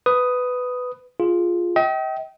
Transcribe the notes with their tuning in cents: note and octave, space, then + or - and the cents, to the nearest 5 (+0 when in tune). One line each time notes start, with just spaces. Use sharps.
B4 +10 D#6 +0
F4 +0 G#4 +0
D#5 +40 G5 -25